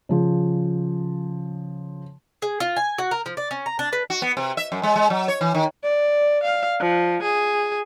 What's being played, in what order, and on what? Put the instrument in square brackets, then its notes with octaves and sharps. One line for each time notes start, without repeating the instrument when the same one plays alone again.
[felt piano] C#3 F3
[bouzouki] G#4
F4
G#5
F#4
A#4
F3
D5
C#4
A#5
D4
B4
[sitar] F#4
B3
C3
E5
F#2
G#3
G#3
F#3
C#5
E3
D#3
[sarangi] D5
F5
F3
G#4